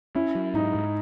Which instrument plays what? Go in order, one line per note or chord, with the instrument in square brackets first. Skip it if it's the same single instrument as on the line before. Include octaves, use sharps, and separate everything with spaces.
[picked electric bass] C#4 [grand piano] E4
[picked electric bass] F#3
[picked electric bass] G#2 [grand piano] D#4
[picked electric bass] G#2